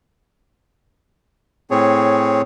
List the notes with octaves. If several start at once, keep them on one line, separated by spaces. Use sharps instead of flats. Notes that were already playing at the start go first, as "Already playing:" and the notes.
A2 C4 G#4 C#5